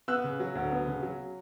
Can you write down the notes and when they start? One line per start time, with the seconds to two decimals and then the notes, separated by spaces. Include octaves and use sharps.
0.08 B3 E6 F#6
0.24 C#3
0.40 F#3
0.55 D2
0.71 B3
0.87 C#3
1.03 F#3